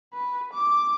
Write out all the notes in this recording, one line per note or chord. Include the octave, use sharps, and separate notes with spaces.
B4
D6